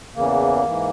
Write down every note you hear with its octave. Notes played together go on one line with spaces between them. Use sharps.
E2 C#3 E3 A#3
G#2 E3